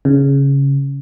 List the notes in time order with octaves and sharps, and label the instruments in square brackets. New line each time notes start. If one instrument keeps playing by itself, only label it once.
[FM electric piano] C#3